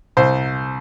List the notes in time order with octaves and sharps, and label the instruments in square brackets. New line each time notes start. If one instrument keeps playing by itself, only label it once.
[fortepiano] C2 C5